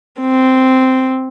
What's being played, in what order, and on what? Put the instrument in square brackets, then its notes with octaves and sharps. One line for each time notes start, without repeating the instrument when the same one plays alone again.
[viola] C4